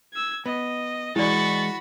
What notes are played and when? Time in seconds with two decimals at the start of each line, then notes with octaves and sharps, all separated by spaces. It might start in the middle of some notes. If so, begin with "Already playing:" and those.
0.13 E6 G#6
0.46 B3 D#5
1.16 E3 G#3 E4 F#4 D5 B5 C#6 A6